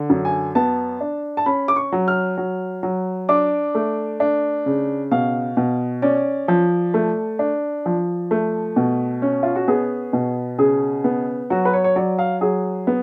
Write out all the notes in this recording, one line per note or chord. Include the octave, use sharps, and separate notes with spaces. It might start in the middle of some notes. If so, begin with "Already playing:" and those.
Already playing: D3
F#2
G#5
B3 A5
D4
A5
C#4 B5
D6
C#6
F#3
F6
F#3
F#3
D4 D6
A3
D4
C#3
B2 F5
B2
C#4 D5
F3
A3
D4
F3
A3
B2
C#4
F4
F#4
B3 G#4
B2
C#3 G#4
B3
F#3 F#4
B4
C#5
C#5
F#3 D5
F5
F#3 G#4
B3